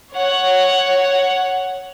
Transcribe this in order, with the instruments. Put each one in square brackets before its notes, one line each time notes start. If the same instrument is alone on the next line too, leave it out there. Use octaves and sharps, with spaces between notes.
[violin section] C#5 F#5